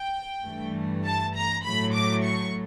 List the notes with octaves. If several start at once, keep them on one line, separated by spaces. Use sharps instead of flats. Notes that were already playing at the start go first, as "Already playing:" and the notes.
Already playing: G5
G2 E3 A3
A5
A#5
A2 F#3 A3 B5
D6
C#6